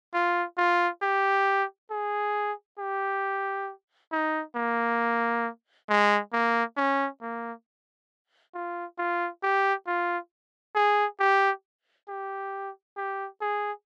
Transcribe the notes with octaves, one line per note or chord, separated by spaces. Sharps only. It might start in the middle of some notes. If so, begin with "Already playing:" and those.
F4
F4
G4
G#4
G4
D#4
A#3
G#3
A#3
C#4
A#3
F4
F4
G4
F4
G#4
G4
G4
G4
G#4